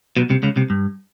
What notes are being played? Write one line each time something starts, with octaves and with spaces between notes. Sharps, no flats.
B1 B2
C2 C3
C#2 C#3
C2 C3
G2